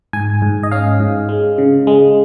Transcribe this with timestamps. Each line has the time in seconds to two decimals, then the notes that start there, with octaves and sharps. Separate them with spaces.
0.13 G#2 G#5
0.42 G#2
0.63 D#5
0.71 C#4 F5
1.00 G#2
1.29 G#3
1.58 C#3
1.87 G#3